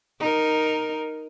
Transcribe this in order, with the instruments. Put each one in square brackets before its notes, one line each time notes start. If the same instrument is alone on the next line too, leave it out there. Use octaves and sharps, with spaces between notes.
[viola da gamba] D#4 A#4